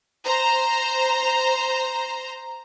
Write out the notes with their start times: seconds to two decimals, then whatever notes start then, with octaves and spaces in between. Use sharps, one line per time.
0.24 C5 A#5